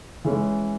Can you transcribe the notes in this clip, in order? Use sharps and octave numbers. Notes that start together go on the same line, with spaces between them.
E3 G#3 C#4